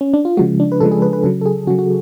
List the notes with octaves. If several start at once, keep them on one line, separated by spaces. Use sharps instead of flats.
C#4
D4
F4
C#3 F3 G#3 F#4
D4
B4
C#3 F3 G#3 A4
G#4
B4
B4
C#3 F#3 A4
A4
G#4
C#3 F#3 F#4
F#4